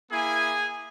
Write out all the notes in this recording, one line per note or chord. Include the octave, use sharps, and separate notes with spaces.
A#3 E4 G#4 G#5